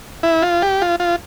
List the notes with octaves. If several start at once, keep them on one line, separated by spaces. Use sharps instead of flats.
E4
F4
G4
F4
F4